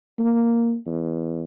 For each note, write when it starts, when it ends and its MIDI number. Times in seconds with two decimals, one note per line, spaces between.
0.19 0.76 58
0.86 1.43 40